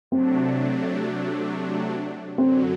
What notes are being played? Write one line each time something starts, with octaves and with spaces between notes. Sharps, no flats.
C3 F#3 A3 C4 D4
F#2 D3 F#3 C4